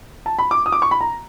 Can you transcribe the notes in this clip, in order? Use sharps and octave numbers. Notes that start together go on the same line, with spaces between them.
A5
B5
D6
D#6
D6
C#6
B5
A#5